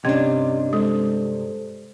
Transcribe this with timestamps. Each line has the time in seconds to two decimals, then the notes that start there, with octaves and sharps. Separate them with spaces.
0.05 G2 C3 C#4 D4 C#5 D#5
0.73 G#3 A4 C5